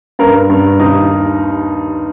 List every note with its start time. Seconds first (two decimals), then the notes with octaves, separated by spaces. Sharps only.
0.19 G2 A#4
0.50 G2
0.80 D#2 D#4